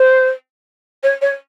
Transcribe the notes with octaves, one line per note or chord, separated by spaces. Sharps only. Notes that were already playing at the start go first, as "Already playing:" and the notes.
Already playing: C5
C#5
C#5